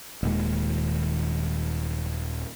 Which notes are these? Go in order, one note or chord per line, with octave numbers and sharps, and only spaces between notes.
D#1 D#2 G#3